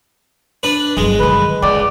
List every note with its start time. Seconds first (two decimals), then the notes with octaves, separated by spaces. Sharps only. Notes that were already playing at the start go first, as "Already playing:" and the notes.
0.63 D4 B4
0.97 G1 F#3 G#3
1.20 D3 D#3 B4
1.63 C#2 C#4 D5